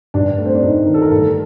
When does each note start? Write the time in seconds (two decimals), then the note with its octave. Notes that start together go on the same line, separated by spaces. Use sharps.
0.14 G2 D4
0.38 A3
0.46 C4
0.54 D4
0.62 G2 D#4
0.87 D#3 A#4
0.94 A4
1.02 A#4
1.11 G2 A4